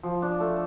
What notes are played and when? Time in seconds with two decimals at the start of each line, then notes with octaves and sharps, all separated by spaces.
0.03 F3
0.22 D4
0.40 A3